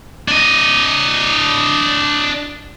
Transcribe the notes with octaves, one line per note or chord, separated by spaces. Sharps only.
D4 D#5